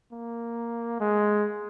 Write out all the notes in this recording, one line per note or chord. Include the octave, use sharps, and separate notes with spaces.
A#3
G#3